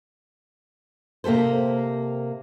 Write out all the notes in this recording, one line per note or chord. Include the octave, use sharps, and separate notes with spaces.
C3 A#3 G4 A4 C5